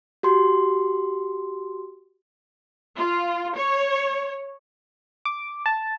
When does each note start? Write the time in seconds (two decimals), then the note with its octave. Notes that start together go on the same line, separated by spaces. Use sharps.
0.23 F#4 G4 C6
2.97 F4
3.56 C#5
5.25 D6
5.66 A5